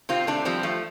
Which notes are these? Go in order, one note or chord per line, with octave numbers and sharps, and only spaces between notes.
C3 C4 F4
C3 A3 D4
F3 G3 C4
F3 A3